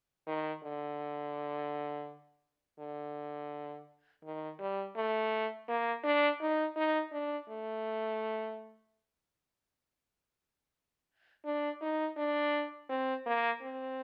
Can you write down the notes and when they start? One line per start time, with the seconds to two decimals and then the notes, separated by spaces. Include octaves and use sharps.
0.27 D#3
0.63 D3
2.79 D3
4.24 D#3
4.59 G3
4.96 A3
5.69 A#3
6.04 D4
6.41 D#4
6.76 D#4
7.12 D4
7.49 A3
11.45 D4
11.81 D#4
12.17 D4
12.89 C4
13.26 A#3
13.62 C4